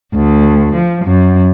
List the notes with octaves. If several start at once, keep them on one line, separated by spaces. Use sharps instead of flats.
D2
F3
F#2